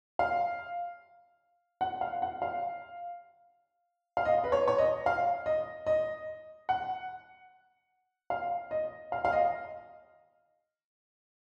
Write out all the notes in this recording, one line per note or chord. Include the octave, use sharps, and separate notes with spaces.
F5
F#5
F5
F#5
F5
F5
D#5
B4
C#5
C#5
D#5
F5
D#5
D#5
F#5
F5
D#5
F5
F5
D#5